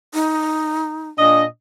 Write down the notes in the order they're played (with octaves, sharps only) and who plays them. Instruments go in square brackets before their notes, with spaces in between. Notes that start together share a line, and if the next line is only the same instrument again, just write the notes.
[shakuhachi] D#4
[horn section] A#2 D4 D#5